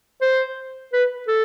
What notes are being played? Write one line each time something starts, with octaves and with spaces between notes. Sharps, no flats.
C5
B4
A4